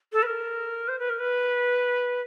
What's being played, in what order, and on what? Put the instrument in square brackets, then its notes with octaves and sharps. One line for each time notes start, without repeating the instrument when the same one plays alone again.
[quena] A4
B4
A#4
C5
B4
A#4
B4